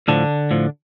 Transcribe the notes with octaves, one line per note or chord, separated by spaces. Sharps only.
A2 D3 F3 D4
A2 F3